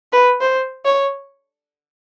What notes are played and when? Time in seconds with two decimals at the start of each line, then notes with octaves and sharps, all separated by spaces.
0.12 B4
0.41 C5
0.85 C#5